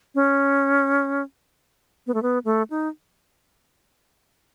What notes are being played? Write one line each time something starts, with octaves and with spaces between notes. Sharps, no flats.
C#4
B3
A3
B3
A3
D#4